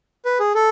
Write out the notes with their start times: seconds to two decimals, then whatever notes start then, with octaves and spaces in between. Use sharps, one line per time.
0.25 B4
0.40 G#4
0.55 A4